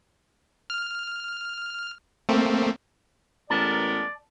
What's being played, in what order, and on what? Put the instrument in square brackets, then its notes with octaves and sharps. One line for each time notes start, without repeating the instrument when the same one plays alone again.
[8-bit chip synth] F6
A3 A#3 C4
[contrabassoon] A1 [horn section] G#3 B3 A#4 [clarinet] D5 [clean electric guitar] A5